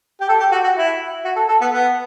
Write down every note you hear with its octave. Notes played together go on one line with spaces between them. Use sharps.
G4
A4
G4
F#4
F#4
E4
F#4
A4
A4
B3
B3